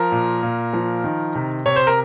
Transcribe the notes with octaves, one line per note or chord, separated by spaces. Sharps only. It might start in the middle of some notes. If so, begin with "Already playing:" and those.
Already playing: F3 A#4
A#2
A#2
F3
D#3
C3
C3 C#5
C5
A#4